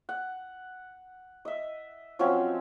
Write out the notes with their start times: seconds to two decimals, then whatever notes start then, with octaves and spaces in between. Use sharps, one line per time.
0.09 F#5
1.45 D#5 E5
2.19 F3 F#3 C4 C#4